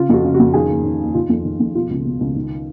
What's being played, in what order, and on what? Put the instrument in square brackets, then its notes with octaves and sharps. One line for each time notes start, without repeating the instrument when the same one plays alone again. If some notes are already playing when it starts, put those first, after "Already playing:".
Already playing: [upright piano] C#3 F4
F2 F#4
C#3
F#4
F2
D#3 G#4
D#2
D#3
D#2
D#3 F4
F2
D#3
F2
B2 F4
C#2
B2
C#2
D#3